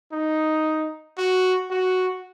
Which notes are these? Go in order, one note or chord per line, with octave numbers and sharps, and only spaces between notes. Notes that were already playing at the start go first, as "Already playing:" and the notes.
D#4
F#4
F#4